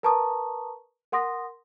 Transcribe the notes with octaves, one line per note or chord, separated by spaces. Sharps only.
A#4 B4 A5 A#5 C#6 D#6
A#4 F#5 C6 D#6 A#6